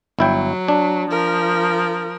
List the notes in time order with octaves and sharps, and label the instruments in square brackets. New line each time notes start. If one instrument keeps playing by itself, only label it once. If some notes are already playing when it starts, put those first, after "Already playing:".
[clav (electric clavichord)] G1 E4 G5 [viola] F#3
[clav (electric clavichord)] D4
[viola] F3 A#4